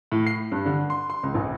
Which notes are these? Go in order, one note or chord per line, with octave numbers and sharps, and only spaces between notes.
A2
C7
G2
D3
C6
C6
C#2
A#1